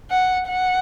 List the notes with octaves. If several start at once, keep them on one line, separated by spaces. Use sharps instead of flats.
F#5
F#5